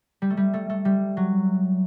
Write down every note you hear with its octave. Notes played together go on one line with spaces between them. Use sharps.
G3
A3
G3
A3
A3
G3
F#3